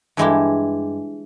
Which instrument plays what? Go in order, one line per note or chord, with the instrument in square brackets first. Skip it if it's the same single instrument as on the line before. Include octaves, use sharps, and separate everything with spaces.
[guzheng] G2 E3 G#3 E4 G4